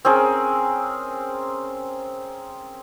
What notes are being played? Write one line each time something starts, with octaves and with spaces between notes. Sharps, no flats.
C4 C#4 G#4 A#4